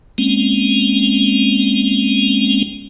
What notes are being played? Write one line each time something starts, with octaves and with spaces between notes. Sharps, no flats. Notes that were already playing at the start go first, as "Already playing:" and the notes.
G#3 A#3 C4 C#4